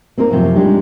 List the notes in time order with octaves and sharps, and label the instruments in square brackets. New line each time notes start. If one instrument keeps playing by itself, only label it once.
[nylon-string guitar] A#3 C4 D#4 A#4
F#2 A2 C3 E3 F3
G3 G#3 D4 D#4 G4